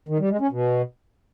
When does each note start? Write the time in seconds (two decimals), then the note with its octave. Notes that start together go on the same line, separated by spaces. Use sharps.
0.08 D#3
0.19 G3
0.30 G#3
0.41 C#4
0.51 B2